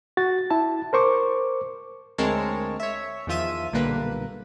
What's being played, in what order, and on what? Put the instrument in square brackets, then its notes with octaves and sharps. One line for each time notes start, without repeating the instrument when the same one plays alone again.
[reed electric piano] F#4 A6
E4 A5
A#4 C5 C#6 D6
[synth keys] D2 G#3 C4 A#4 C#5 A5
C#5 E5
E2 D#3 F3 F4 E5 D#7
B1 A#2 D3 G3 A#3 B4